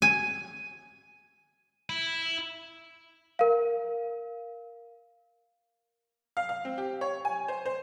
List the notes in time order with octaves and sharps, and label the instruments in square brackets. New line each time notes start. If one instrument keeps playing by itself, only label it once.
[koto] G#5
[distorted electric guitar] E4
[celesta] A#4 F5
[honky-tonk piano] F5
F5
C4
G4
C#5
G#5
C5
C5